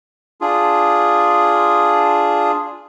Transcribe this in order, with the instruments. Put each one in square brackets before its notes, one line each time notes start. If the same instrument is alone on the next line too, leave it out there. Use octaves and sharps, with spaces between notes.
[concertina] D4 F4 G#4